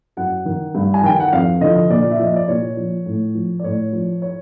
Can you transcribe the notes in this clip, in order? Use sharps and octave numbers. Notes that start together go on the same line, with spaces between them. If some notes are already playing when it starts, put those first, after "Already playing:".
F#2 F#5
D#3
G2
G#5
D#3 G5
F#5
F2 F5
D3 F3 D#5
A#2 D5
E5
F3 D#5
D5
A#2 C#5
F3
A2
F3
D5
A2 C#5
F3
C#5